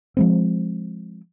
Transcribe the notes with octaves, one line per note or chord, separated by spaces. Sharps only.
F3 G#3 C4